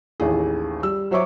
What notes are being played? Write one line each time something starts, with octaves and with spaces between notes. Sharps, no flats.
A1 D#2 G#4
G3 E6
F#3 C5 C#5 E5 C#6 D6